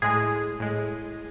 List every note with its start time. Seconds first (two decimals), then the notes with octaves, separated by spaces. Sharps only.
0.02 A2 G#3 G#4
0.60 A2 G#3